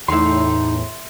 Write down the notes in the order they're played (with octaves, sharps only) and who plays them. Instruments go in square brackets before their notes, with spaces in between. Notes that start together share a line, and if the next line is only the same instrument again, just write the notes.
[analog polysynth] E2 A2 [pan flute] D#4 [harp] E5 C6